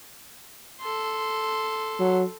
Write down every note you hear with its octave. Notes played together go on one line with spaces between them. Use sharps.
A4 C6
F#3